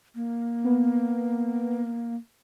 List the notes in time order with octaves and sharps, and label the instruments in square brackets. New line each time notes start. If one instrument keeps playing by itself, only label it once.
[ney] A#3
[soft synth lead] B3